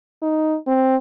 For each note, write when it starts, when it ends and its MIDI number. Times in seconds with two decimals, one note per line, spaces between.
0.22 0.57 63
0.67 0.96 60